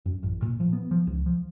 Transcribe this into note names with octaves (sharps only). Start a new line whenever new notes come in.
F#2
A1
A#2
F3
B3
F3
C#2
F3